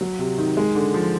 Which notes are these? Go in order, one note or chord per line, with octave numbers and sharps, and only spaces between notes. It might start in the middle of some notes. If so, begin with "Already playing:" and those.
F#3
C3
D#3
G#3
D3
F3